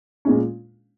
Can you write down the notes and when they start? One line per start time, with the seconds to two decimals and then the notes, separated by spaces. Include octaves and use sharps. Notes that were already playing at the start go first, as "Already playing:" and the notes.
0.25 A#2 G#3 C#4